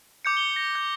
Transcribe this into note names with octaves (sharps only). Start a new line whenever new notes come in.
D6 G6 C#7
C#7 G7
A#6
G6